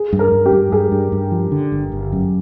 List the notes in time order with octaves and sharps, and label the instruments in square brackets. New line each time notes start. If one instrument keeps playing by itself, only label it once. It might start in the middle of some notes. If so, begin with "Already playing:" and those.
Already playing: [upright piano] G#4
[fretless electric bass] G2
[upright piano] A#4
[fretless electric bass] G2
[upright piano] G4
[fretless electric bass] G2
[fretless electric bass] G2 [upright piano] G#4
[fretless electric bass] G2
G2
F3
D3
G1
G1
F#2